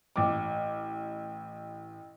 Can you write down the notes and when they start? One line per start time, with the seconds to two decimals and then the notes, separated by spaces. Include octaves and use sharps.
0.16 A1 D6